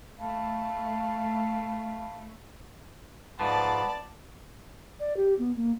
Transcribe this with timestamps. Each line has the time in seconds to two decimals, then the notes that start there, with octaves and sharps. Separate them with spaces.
0.19 A3 F5 A5 B5
3.40 G#2 F3 A3 B3 D5 A5
4.99 D5
5.17 G4
5.39 B3
5.56 A#3